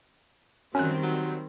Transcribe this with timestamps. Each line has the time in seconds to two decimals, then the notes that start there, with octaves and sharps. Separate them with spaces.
0.75 F#2 D#3 G3 C4 C#4 F#6
1.03 F#3